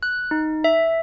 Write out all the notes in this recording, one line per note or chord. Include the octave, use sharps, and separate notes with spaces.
F#6
D#4
E5